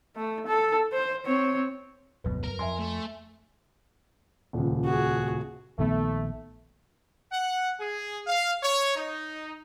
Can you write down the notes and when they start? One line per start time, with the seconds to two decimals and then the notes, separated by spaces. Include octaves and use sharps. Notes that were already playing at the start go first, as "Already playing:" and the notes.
0.16 A3
0.47 A4
0.93 C5
1.25 C4 C#5
2.24 F1 D2 G2 B2 F#3 B4
2.44 A#4
2.59 F2 E5 G#5 C6
2.79 A3
4.53 D#1 C#2
4.84 F#4 G#4
5.79 A#1 D#3 A3 B3
7.32 F#5
7.79 G#4
8.27 F5
8.63 C#5
8.96 D#4